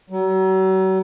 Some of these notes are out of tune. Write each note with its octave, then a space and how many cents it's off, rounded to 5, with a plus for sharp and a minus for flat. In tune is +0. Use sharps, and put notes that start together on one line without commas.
F#3 +40